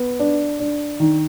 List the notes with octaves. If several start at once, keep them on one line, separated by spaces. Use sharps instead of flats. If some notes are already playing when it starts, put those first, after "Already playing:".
Already playing: B3
D4
D4
D#3